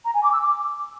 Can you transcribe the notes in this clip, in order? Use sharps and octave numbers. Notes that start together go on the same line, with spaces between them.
A#5
G#5
D6
E6
D6